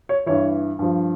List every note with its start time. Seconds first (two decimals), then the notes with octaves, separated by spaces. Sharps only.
0.09 C#5
0.26 G2 E3 C#5
0.79 G2 F3